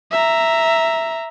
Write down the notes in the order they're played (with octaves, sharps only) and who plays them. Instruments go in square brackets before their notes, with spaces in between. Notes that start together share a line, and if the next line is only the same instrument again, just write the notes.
[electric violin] E5 A#5